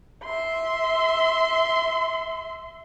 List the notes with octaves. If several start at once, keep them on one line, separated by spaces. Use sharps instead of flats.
E5 C6